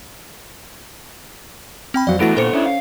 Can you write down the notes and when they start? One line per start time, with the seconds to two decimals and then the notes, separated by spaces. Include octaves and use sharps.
1.94 C4 G5 B5
2.07 F2 F#3 C4 D5 F5
2.20 D3 E3 A3 B3 E4 F#4 A#6 D7
2.37 A#2 A4 C5 C#7
2.53 C#4 D4 E4
2.66 F5